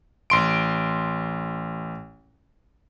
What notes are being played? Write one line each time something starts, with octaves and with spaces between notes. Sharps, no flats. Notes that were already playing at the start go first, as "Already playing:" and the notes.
A1 C6 D7